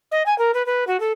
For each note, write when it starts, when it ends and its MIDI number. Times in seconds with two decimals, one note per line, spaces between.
0.11 0.23 75
0.26 0.36 80
0.38 0.51 70
0.54 0.65 71
0.66 0.84 71
0.87 1.00 66
1.00 1.12 69